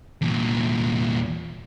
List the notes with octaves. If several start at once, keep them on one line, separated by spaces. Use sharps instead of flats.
E2 A#2